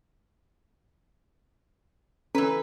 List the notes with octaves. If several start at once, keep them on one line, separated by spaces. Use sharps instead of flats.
E3 C#4 A4 B4 A#5